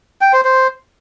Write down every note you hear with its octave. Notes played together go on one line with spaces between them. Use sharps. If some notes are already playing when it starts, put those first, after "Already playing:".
G5
C5
C5